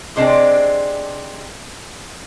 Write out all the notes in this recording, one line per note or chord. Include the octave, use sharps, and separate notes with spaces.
C3 G#3 C4 D4